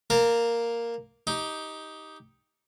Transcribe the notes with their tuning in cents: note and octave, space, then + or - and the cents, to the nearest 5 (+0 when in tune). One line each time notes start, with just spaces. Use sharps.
A#3 +0 A#4 +0 A5 +40
D#4 +10 G4 +0